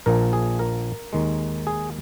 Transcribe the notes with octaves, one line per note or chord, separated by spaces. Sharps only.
A#1 A#2 F3 A#4
G#4
A#4
D#2 D#3 G#3
G#4